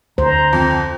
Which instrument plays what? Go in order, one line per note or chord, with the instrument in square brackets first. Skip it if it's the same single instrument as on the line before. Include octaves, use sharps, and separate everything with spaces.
[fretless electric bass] D2 [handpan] C5 [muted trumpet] A#5
[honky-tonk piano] F2